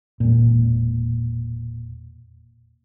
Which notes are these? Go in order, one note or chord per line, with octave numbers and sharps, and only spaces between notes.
E1 A#2